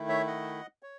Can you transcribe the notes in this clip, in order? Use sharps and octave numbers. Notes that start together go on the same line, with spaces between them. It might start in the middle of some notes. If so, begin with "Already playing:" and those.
Already playing: D#3 A3 E4
C#5 E5
D#5 F#5
C#5